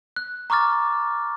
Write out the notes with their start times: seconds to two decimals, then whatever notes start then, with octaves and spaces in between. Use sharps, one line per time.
0.16 F#6
0.50 A#5 C#6 D6 F6 A6